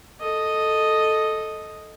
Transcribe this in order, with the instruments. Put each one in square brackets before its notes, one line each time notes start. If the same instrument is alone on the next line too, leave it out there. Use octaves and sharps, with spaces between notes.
[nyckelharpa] A4 D#5